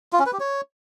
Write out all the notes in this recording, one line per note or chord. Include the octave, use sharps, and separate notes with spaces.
F4
C#4
B4
G4
C#5